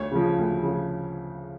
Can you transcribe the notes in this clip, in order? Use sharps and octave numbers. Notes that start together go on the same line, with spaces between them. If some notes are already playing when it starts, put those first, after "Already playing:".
Already playing: D2 C#5
C#3 F3
D2
C#3 F3